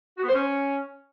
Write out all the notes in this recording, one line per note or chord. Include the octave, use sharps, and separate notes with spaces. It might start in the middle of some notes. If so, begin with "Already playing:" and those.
F#4
B3
C5
C#4